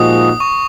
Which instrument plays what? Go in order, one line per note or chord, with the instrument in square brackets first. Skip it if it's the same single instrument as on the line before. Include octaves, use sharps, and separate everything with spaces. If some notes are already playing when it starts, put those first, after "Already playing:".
Already playing: [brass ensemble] A#2 F3 G#3 D#4 F#4 [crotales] D#6
[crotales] D#6
C#6